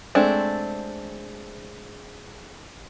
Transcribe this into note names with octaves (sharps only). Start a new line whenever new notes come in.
G#3 A3 C4 D4